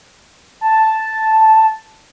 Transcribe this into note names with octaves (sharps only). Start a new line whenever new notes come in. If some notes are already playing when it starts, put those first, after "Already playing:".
A5